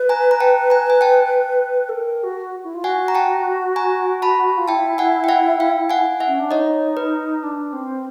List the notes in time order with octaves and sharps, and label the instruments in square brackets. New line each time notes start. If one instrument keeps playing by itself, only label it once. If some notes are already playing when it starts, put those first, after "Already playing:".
Already playing: [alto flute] B4
[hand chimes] G#5 A#5
A#5
G5 A5
G#5 A#5
G#5
G5 A5
[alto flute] A4
A#4
F#4
E4
F4
[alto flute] F#4 [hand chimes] F#5 G#5
[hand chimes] A#5
G5 A5
G#5 A#5
A5 B5
[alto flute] F4
[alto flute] E4 [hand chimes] G5 A5
[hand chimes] F#5 G#5
G5
E5 F#5
F5 G5
F#5 G#5
E5 F#5
[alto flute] C#4
D4
[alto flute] D#4 [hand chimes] C#5 D#5
[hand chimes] B4
[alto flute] D4
C4